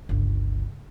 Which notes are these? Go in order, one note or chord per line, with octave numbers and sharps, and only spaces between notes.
G1 C#2